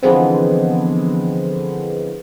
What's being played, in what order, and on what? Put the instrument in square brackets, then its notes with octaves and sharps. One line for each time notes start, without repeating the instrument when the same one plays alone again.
[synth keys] D3 E3 F3 G#3 B3 C4